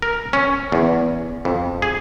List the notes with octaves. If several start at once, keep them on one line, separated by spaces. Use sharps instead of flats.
A#4
C#4
E2
F2
G#4